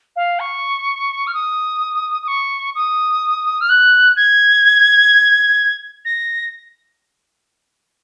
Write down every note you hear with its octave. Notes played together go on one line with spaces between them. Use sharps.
F5
C#6
F6
D#6
D#6
C#6
D#6
F6
F#6
G#6
A#6